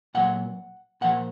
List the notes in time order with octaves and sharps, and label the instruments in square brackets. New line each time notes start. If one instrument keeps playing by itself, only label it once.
[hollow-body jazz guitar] A#2 F#3 F#5
A#2 F3 F#5